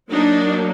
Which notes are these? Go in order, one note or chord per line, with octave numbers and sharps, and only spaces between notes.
F#3 A#3 D4 D#4